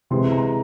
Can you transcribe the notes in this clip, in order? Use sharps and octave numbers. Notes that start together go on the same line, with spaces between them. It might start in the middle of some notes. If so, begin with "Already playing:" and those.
C3 E3 G#3 C6
A#5